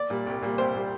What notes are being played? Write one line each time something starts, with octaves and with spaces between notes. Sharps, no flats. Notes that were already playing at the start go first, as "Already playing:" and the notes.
Already playing: D5
A#2 G3
C2
A#2 G3
C2 C5
A#2 G3